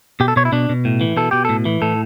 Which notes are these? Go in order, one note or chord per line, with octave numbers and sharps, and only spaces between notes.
B2 G4
A4
B2 C#5
E4
B2 D4
B2
A2
E3
B2 A4
B2 G4
A2 A4
E3
A2 A4